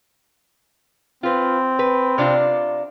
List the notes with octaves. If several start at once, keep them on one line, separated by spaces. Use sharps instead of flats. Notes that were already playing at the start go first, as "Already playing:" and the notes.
C4 F4 B4
B4
C3 D4 F4